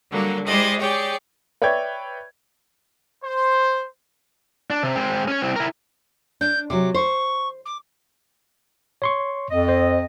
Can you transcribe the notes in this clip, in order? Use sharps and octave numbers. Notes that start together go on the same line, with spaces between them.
D3 F#3 G3 A#3
G#3 E4 G4 C5 D5 D#5
G4 G#4 C#5 D5 G5
B4 C#5 D5 E5 G5 G#6
C5
D4
C3
G#3 C4
C#4 C#5
C2 C4
E4 A#4
D4 G6
C3 F#3 D6
C5 C#6
D6
C#5 C6 C#6
F2 D#5
C5